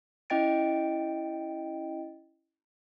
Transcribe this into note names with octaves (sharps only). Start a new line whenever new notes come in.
C#4 E4 D#5 G5 A6 D7